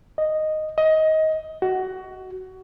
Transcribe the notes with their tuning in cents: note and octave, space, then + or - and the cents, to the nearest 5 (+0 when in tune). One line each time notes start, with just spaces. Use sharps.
D#5 -5
D#5 +20
F#4 +20